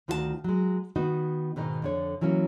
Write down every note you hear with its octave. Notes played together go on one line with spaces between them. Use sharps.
D2 D#3 F4 F#4 C5 A5
F#3 G#3
D#3 B3 D#4 F#4
G#2 B2 D#3 D#4
F2 D3 C#5
E3 F#3 A#3 C#4